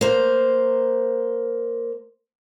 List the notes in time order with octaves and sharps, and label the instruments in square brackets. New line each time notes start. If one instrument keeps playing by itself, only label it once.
[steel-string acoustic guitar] A#3 C5